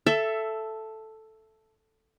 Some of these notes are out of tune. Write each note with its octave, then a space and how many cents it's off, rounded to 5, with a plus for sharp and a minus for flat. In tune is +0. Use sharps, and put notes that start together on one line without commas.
A4 +0 E5 +15